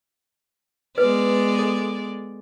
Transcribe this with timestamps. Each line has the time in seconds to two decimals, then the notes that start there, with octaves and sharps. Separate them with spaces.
0.98 G#3 B3 B4 D5
1.59 A4